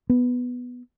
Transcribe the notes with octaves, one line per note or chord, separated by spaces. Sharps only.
B3